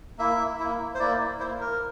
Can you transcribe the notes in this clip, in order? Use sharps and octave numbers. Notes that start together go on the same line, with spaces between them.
A#3 E4 E5
A#3 E4
C5
A#3 E4 D5
A#3 E4 C5
A#4